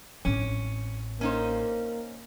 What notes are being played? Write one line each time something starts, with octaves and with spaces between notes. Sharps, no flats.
A1 C4 C#4
A#3 C#4 D#4 C5